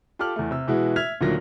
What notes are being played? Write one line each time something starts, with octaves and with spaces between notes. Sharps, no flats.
F4 G4 A4 D6 F6 F#7
E2 A3
C3 E6
B2 E3 G#3 E4 F#4
E5 F6 G#6 B6 F7
D2 A#2 D#3 F3 F#3 A#6